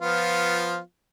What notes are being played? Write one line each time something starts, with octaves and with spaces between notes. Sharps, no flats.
F3 B3 F4